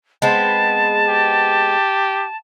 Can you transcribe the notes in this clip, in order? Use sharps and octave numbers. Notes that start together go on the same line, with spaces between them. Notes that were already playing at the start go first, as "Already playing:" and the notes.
G#3 B3 C4 A5
G4